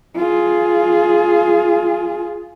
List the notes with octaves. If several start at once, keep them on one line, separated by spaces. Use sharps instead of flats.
F4 G#4